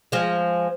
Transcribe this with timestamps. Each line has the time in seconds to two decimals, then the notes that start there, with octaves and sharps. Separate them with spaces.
0.12 F3 G#3